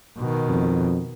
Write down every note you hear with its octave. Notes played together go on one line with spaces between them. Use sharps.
B2 D#3
F2